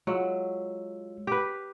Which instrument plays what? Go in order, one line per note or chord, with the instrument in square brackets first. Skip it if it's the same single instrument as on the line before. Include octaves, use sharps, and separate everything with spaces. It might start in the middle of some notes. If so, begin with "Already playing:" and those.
[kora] F#3 [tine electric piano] G#3 F4 E6
[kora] G4 B4